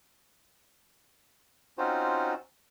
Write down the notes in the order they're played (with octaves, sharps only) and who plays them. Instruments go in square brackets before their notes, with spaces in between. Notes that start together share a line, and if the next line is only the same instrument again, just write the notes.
[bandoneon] C4 C#4 D#4 F4 F#4 C5